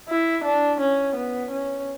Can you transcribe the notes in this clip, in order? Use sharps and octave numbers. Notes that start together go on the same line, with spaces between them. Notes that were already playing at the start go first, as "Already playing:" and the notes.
E4
D4
C#4
B3
C#4